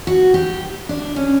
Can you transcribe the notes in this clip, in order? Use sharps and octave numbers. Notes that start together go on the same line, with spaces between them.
F#4
G4
D4
C#4